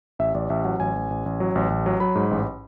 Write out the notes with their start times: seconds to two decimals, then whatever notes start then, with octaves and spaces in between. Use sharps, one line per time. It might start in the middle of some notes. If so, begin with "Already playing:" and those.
0.19 A1 E5
0.34 A1 D5
0.50 A1 E5
0.65 F#3 F#5
0.80 A1 G#5
0.95 A1
1.10 A1
1.26 A1
1.40 F#3
1.55 A1
1.70 A1
1.86 F#3
2.00 F#3 B5
2.15 G#2
2.31 A1